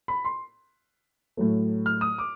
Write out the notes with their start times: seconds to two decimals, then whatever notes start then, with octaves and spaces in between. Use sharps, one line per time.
0.08 B5
0.25 C6
1.37 A2 F#3 A3
1.86 F6
2.01 D#6
2.18 D6